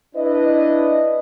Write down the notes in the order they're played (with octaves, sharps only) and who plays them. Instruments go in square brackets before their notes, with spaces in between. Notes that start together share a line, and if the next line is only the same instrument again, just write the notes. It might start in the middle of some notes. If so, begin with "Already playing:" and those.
[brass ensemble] D4 E4 B4 D#5